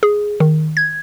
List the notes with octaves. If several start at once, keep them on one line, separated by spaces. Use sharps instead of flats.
G#4
D#3
G#6